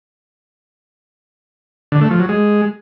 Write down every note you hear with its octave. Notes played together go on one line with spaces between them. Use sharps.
D3
A3
F3
F#3
G#3